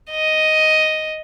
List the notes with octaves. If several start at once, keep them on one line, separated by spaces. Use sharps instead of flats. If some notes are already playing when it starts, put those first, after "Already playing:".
D#5